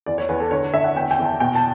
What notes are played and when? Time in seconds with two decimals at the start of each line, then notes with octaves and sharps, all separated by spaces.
0.06 E2 D5
0.18 C#5
0.29 E2 B4
0.40 A4
0.51 D3 C#5
0.74 D3 E5
0.84 F#5
0.96 E2 G5
1.11 G5
1.19 E2
1.25 A5
1.40 B2 G5
1.55 A5